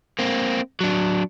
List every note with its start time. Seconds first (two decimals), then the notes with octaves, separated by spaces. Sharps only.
0.19 A#3 C4
0.81 F#3 D4